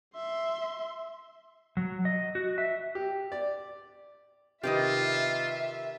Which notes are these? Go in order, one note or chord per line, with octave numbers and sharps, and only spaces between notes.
E5 C6
F#3
D#5
F#4
E5
G4
D5
C3 D#3 F4 G4 B4 D#5 E5